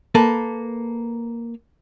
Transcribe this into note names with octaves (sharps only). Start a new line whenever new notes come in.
A#3 A4 B4